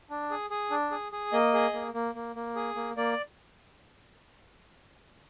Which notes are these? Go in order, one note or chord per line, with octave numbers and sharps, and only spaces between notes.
D4
G#4
G#4
D4
G#4
G#4
A#3 D#5
G#4
A#3
A#3
A#3
A#3
G#4
A#3
A#3 D5